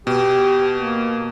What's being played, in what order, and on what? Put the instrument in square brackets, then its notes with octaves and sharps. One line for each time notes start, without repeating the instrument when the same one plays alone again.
[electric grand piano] B2 [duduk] G4
[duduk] A#3